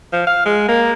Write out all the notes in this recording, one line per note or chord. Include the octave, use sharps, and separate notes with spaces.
F3
F5
G#3
A#3